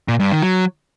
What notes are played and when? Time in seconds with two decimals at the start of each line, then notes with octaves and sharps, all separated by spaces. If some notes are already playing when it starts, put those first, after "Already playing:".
0.08 A#2
0.20 G2
0.31 D#3
0.42 F#3